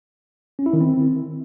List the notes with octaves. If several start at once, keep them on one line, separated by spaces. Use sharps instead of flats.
C#4
E4
D#3
C4